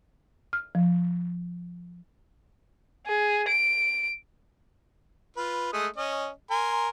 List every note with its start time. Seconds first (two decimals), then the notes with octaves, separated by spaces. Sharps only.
0.53 F6
0.75 F3
3.07 G#4
3.48 D7
5.37 F4 B4
5.73 G#3 A3 D#6
5.96 C#4 D#5
6.51 A#4 G#5 C6